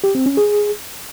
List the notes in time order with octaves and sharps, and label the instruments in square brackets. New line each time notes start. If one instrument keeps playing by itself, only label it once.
[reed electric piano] G4
C4
C#4
G#4